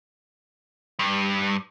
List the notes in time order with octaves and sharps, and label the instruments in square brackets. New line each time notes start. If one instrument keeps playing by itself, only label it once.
[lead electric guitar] G2